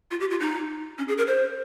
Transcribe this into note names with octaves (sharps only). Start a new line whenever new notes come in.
F4
G4
F4
D#4
C#4
G#4
A#4
C5